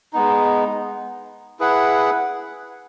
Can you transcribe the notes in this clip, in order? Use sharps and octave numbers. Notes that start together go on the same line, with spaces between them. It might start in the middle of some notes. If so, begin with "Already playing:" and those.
G#3 B3 D#4
E4 G#4 B4 F#5